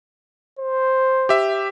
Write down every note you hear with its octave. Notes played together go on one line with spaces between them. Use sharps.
C5
G4 E5